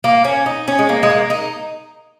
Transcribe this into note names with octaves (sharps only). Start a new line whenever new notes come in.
A#3
C#4
D#4
C#4
G#3
A#3
G#3
A#3
D#4